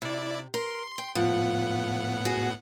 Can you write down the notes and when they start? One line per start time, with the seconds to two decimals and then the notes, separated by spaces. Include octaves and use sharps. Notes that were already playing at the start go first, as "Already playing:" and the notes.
0.02 C3 E4 D5
0.54 A#4 C6
0.98 G5
1.15 A2 F3 B3 F#5
2.25 F#4 G#4